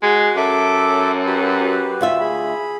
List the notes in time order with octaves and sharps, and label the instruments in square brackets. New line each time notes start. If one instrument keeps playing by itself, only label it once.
[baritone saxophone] G#3 [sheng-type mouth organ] F#4
[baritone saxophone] F#2 [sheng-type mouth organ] A4 E5 D6
[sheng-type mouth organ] F#4 G4 B4
[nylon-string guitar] D2 F4 E5 [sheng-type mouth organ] B5
[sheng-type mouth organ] G#4 B5